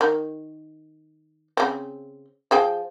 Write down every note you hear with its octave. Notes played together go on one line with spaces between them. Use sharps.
D#3
C#3 C4
F3 G#4 G5